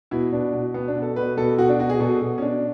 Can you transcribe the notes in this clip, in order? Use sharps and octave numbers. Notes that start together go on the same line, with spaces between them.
B2 E4
B2 D4
B2
B2 B3
D4
B2
A4
B2 B4
B2 A4
B2 F#4
D4
B2 F#4
G#4
B2 A4
B2
C#4
B2 D4